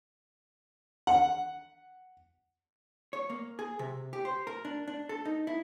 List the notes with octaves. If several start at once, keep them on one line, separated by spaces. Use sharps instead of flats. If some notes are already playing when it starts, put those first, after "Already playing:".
F#5
C#5
A#3
G#4
C3
G4
C5
A#4
D4
D4
A4
D#4
E4